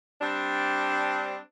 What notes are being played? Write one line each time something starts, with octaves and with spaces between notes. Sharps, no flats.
G3 C4 D4